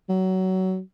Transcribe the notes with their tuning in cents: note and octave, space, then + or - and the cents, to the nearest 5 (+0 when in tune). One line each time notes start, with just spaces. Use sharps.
F#3 +20